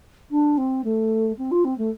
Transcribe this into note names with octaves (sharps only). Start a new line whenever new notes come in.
D4
C4
A3
C4
F4
C4
A3